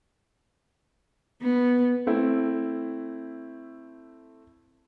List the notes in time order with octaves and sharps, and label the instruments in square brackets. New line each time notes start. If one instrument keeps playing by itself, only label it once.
[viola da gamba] B3
[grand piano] A3 C4 E4